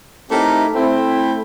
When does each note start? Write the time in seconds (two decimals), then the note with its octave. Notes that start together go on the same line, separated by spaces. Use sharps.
0.30 A3 C4 D#4 E4 G4 A#4
0.75 A3 C4 E4